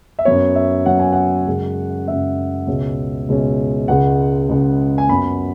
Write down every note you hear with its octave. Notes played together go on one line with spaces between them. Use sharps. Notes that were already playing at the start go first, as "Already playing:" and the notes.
E5
F#2 F#3 B3 C#5
E5
F#2 F#3 B3 F#5
G#5
F#5
F#2 C#3 G#3
F#2 C#3 G#3 E5
C#2 B2 G#3 C#4
C#2 B2 G#3 C#4
C#2 C#3 G#3 F#5
C#2 C#3 G#3
G#5
F#2 F#3 B3 B5